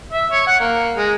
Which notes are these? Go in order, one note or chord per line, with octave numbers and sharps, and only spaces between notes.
E5
C#5
F#5
A#3
G#3